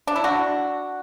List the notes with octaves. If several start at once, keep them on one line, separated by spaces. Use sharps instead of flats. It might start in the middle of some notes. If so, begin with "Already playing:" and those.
D4
E4
D4 F#4